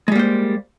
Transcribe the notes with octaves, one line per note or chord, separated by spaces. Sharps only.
G3 G#3 A#3 C5